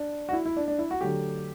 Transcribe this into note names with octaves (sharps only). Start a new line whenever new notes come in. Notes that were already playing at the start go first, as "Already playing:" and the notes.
Already playing: D4
F#4
E4
E4
D4
D4
E4
F#4
D3 F#3 A3 G4